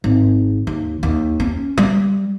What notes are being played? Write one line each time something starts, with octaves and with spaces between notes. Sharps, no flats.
G#1
D#2
D#2
C#4
G3